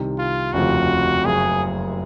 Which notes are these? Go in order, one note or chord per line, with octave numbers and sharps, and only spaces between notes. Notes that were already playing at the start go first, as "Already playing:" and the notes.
Already playing: C2 C3 D#3
F4
F1 D#2 C#3 F3 C4 F#4
F#1 F#2 C#3 G#4